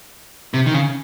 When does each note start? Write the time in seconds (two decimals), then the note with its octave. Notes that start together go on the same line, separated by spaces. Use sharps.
0.54 C3
0.66 D#3
0.74 C#3